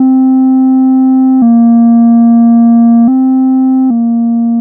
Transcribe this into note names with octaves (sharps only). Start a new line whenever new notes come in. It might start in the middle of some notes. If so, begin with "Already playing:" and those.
Already playing: C4
A#3
C4
A#3